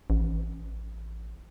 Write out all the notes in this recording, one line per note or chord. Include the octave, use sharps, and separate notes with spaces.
A1